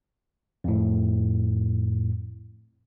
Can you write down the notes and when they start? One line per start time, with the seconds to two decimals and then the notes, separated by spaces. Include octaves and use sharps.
0.64 F2 A2